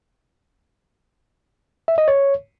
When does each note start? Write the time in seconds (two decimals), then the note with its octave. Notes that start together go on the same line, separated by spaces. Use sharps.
1.88 E5
1.98 D#5
2.08 C#5